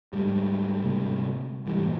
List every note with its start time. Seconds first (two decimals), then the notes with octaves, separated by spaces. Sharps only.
0.13 D2 G#2 G3
0.84 C3 A#3
1.66 G#2 E3 G3
1.84 E2 A#2